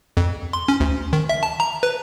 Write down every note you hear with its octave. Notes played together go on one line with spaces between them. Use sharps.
F2
C6
C#4
D2
D#3
E5
A5
A#5
B4